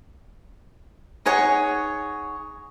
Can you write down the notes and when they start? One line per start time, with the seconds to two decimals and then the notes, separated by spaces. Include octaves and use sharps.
1.26 D#4 G#4 C#5 F#5